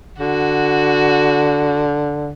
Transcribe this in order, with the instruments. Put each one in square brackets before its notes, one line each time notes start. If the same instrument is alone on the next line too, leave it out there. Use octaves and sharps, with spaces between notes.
[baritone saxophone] D3 [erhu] F#4